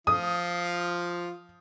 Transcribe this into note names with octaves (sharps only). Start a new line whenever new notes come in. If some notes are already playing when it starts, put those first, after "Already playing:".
F3 F4 D#6